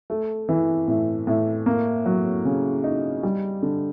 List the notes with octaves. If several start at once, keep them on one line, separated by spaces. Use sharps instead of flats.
A3
E3
A2
A2
A#3
F#3
C#3
D#4
G3
D3